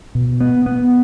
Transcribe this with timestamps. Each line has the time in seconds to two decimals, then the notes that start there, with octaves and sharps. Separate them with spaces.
0.15 B2
0.41 B3
0.66 B3